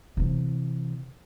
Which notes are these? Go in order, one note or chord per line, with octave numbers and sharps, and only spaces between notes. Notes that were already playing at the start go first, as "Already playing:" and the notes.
C3 E3